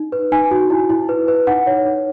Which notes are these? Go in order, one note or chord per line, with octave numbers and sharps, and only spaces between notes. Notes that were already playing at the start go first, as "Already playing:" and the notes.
Already playing: D#4
B4
D#4 G#5
F#4
E4
E4
B4
B4
D#4 F#5
C#5
D#4